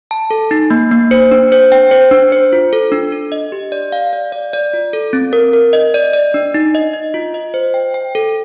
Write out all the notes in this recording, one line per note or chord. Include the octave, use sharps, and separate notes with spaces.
A5
A4
D#4
A#3
A#3
C5
D4
C5
G5
C5
D4
C5
F4
A4
D4
A4
D#5
G4
D5
F5
D5
D5
D5
F4
A4
C4
A#4
A#4
D#5
D5
D5
D4
D#4
D#5
D#5
F4
D#5
C5
G5
G5
A4